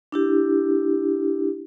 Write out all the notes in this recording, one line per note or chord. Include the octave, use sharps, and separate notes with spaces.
D4 E4 G4